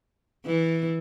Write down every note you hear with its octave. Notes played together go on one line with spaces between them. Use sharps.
E3